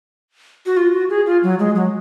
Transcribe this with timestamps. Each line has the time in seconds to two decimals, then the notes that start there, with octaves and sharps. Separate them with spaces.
0.66 F#4
0.77 F4
0.93 F#4
1.10 G#4
1.26 F4
1.43 F#3
1.59 G#3
1.76 F#3